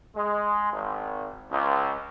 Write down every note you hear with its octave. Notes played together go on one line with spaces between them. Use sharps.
G#3
G#1
C#2